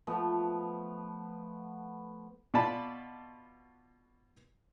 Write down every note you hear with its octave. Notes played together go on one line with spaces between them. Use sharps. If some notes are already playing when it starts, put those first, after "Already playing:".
F3 A3 B3
B2 F4 D5 A5 B5